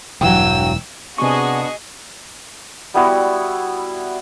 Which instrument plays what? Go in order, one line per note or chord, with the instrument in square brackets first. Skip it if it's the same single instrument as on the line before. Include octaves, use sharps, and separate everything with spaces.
[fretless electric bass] E1 E3 [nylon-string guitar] G2 F#3 [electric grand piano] F#5 G5 [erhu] E6
[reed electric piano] C3 C#6 [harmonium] B3 D4 [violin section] F#4 G#4 D#5
[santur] G3 B3 E4 F#4